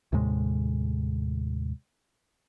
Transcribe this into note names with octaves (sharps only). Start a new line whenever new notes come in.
D#2 A2 C3 G#3